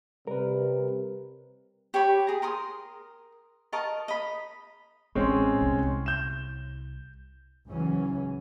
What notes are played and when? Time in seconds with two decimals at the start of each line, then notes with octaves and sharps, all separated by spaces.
0.27 C3 G3 A#4 B4
1.94 G4 C#5 B5
2.27 G#4 A#5
2.42 A#4 C6 D#6
3.72 A#4 D#5 A5 C#6
4.08 D#5 B5
5.15 A1 G#3 C4 C#4
5.61 C2
6.06 G6 E7
7.67 C#2 G#2 E3 F#3 C#4